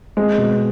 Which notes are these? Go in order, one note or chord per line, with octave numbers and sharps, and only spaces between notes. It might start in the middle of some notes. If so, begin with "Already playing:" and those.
G#3 C4
B2